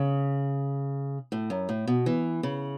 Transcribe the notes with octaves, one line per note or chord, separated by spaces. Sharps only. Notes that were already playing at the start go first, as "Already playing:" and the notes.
Already playing: C#3
A2
F#2
A2
B2
E3
C#3